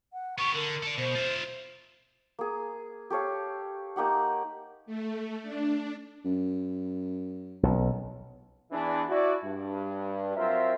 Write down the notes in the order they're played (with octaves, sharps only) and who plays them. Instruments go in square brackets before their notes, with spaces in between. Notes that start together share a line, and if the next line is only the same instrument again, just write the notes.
[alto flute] F#5
[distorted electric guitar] B3 G4 [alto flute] C#6
[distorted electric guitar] D3 [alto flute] A#4
[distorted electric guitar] A4 D5
[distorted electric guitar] B2 [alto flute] C5
[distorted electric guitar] F4 E5
[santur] A#3 G#4
G4 A4 C#5 F5
A#3 D#4 G4 F#5
[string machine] A3
D4
[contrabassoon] F#2
[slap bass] B1
[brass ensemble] E2 E3 D4
E4 F#4 D5
G2
F#3 C4 F4 A#4 C5 E5